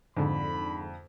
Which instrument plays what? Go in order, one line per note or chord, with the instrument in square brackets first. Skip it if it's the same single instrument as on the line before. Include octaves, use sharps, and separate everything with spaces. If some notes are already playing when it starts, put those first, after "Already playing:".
[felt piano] F2 [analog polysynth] G#2 D3 [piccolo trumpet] B5